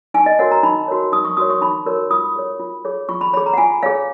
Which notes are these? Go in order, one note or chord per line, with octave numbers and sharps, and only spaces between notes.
D#4 G#5
D#5
F#4 A#4 C#5 F#5
A#5
D#4 B5
F#4 A#4 C#5
D#4 D#6
C#6
F#4 A#4 C#5 D#6
C#6
D#4 B5
F#4 A#4 C#5
F4 D#6
G#4 C#5
F4
G#4 C#5
F4 C#6
B5
G#4 C#5 B5
A#5
F#5
F4 G#5
G#4 C#5 F5